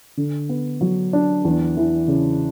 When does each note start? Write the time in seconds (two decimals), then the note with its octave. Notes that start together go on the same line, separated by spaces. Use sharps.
0.17 D3
0.49 B3
0.81 F#3
1.13 D4
1.44 E2
1.77 E3
2.08 C#3